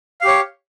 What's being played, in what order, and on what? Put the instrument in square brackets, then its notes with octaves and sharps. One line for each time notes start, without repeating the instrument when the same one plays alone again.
[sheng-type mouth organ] F5
G4
C#5